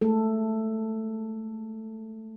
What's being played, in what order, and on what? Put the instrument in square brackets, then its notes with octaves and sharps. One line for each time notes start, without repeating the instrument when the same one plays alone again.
[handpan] G#3 A3 A4